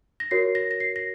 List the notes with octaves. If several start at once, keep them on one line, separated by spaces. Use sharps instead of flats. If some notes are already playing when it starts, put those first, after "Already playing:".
A#6
F#4 A#4 C#5 C7
A#6
A#6
C7
A#6